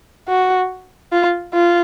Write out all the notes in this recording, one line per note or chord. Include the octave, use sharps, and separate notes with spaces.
F#4
F4
F4